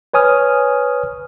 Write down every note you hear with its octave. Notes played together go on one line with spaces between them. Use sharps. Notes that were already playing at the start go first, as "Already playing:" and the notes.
B4 C#5 G#5 D#6 F6